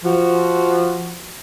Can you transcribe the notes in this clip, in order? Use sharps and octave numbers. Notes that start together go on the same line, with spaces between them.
F3 F#4